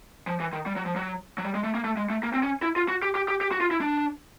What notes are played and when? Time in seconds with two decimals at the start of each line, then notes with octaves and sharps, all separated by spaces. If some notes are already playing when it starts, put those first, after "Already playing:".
0.27 F3
0.40 E3
0.53 D#3
0.66 G3
0.76 F#3
0.86 F3
0.96 F#3
1.38 F#3
1.45 G3
1.55 G#3
1.64 A3
1.75 A#3
1.84 A3
1.97 G#3
2.10 A3
2.23 A#3
2.34 C4
2.43 C#4
2.62 E4
2.76 F4
2.88 F#4
3.02 G4
3.15 G4
3.28 G4
3.41 G4
3.51 F#4
3.61 F4
3.71 E4
3.81 D4